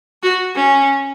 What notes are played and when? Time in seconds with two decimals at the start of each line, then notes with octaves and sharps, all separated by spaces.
0.23 F#4
0.55 C#4